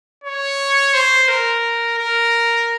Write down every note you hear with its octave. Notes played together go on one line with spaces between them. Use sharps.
C#5
C5
A#4
A#4